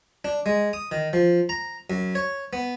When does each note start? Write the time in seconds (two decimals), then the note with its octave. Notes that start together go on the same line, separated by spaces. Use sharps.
0.25 D4
0.46 G#3
0.73 D#6
0.92 D#3
1.13 F3
1.49 A#5
1.90 F#2
2.15 C#5
2.53 B3